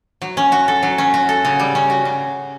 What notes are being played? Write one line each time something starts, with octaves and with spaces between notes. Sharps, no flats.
F#3
C#4
F#4
A4
F#3
C#4
F#4
A4
C#3
G3
C#4
F#4
C#3